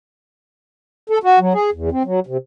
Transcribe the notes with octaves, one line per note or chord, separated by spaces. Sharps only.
A4
F#4
F#3
G#4
E2
C4
F#3
C3